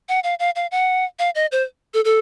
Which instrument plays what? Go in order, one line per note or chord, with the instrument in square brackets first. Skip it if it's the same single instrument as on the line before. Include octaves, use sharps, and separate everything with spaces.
[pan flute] F#5
F5
F5
F5
F#5
F5
D#5
C5
A4
A4